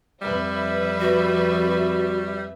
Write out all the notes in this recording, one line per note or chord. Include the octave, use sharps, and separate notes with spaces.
F2 G3 B4 E5
F#4